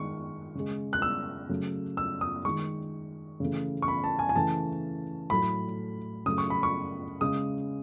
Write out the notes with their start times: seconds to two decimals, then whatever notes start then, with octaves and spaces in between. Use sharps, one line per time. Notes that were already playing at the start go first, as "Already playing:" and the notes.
Already playing: D#3 G#3 C#6
0.55 C#3 G#3
0.93 F#6
1.02 E6
1.49 C#3 F#3 A3
1.97 E6
2.21 D#6
2.45 D#3 G#3 C#6
3.40 C#3 E3 A3
3.82 C#6
3.88 B5
4.04 A5
4.19 G#5
4.29 G#5
4.36 C#3 E3 A3 A5
5.30 A2 F#3 A3 B5
6.26 C#3 F#3 A3 D#6
6.38 C#6
6.50 B5
6.63 C#6
7.21 C#3 G#3 D#6